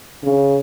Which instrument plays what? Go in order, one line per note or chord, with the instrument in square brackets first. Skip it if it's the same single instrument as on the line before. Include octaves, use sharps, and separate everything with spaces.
[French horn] C#3